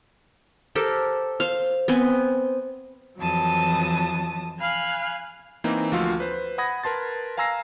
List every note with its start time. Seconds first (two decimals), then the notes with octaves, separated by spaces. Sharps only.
0.75 G4 A4 A#4 C5
1.40 C5 F5
1.88 B3 C4 G#5
3.19 F2 E3 F#3 A5 D#6
4.60 F5 G#5 B5 F6 F#6
5.64 E3 A#3 C4 D#4
5.92 D2 F3 F4 F#4 F5 E6
6.20 B4 C5
6.58 F#5 B5 D#6 G#6 A#6
6.83 A#4 B4 A5 C6 A6
7.37 F5 G#5 A#5 E6 A#6 C7